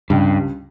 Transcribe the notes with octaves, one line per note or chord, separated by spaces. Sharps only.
C#2 G2